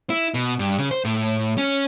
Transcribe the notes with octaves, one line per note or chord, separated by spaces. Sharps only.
E4
B2
G2
C#3
C5
A2
C#4